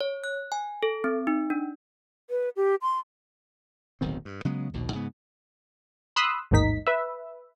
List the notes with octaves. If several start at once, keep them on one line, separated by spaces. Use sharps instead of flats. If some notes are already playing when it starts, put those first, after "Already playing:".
C#5
F#6
G#5
A4
C4
D#4
D4
B4
G4
C6
D1 B1 D#3 C4
G2
C#3 F#3 G#3 B3
A#1 D#2 B2
G#2 C#3 B3
B5 C6 D#6 E6 F#6
A1 D#2 G#2 D#3 D#4 B6
B4 E5